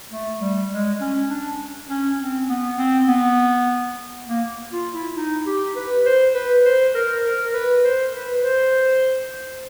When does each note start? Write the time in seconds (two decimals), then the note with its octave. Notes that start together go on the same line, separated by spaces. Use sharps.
0.12 A3
0.41 G3
0.71 G#3
1.01 C#4
1.29 D4
1.89 C#4
2.19 C4
2.49 B3
2.78 C4
3.08 B3
4.27 A#3
4.72 F4
4.94 E4
5.16 D#4
5.46 G4
5.76 B4
6.06 C5
6.34 B4
6.65 C5
6.95 A#4
7.25 A#4
7.53 B4
7.84 C5
8.13 B4
8.43 C5